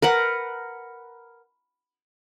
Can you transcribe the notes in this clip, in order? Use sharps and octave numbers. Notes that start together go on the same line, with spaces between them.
A#4 B4 F#5